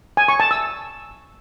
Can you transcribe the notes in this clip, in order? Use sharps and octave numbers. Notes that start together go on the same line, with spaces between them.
G#5
C#6
A5
E6